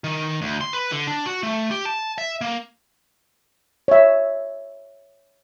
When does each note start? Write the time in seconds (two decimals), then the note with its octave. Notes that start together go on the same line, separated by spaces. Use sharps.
0.04 D#3
0.41 D2
0.61 C6
0.73 B4
0.92 D3
1.07 D4
1.26 F#4
1.43 A3
1.71 G4
1.85 A5
2.18 E5
2.41 A#3
3.88 C#5 E5